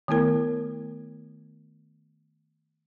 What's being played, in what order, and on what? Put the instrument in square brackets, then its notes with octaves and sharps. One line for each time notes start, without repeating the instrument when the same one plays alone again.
[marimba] D#3 A3 B3 E4 A#4